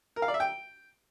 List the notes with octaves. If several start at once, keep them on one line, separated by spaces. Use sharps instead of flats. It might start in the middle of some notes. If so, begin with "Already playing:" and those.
A#4
F5
D5
E5
G5